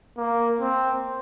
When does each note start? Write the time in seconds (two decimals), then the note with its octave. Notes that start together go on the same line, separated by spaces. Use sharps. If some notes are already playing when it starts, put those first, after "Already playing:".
0.17 A#3
0.60 C4